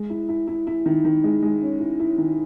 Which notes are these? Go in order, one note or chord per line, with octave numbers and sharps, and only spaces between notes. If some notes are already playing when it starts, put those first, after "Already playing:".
Already playing: G#3
E4
E4
E4
E4
D#3
D#3
G#3
G#3
C#4
E4
E4
D#3